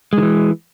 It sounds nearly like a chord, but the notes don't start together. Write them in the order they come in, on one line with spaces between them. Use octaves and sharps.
G#3 D#3 E3